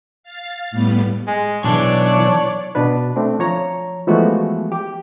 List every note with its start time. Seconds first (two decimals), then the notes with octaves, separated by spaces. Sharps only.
0.23 F5 A6
0.71 A2 G3 B3
1.27 G#3
1.64 B1 E3 D4 C#5 D5
2.75 B2 B3 D4 B4
3.16 A3 C4 D4
3.39 F3 C#5 A#5
4.07 E3 F3 G#3 A3 B3 F#4
4.72 G4